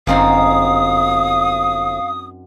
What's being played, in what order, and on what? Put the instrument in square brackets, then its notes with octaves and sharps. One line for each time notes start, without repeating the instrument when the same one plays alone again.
[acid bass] G1 [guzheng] F#2 C4 D#4 [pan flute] F5 [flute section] D#6